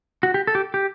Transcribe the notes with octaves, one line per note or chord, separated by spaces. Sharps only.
F#4
G4
A4
G4
G4